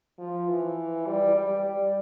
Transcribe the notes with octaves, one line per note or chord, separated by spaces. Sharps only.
F3
E3
G3
G3
G3